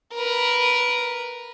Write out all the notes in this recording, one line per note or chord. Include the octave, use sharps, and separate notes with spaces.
A#4 B4